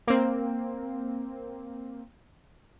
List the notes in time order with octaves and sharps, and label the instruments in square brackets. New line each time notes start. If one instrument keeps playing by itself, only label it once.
[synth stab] A#3 C4